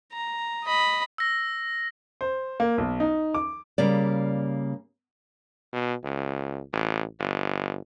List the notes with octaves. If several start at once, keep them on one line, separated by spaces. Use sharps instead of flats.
A#5
D#5 B5
E6 A#6
C5
A#3
B1
D#4
D6
C#3 G3 A#3 D5
B2
C#2
A1
G1